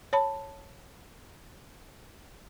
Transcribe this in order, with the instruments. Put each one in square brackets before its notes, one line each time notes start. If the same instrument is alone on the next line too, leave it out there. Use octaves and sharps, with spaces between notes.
[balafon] C#5 A5 B5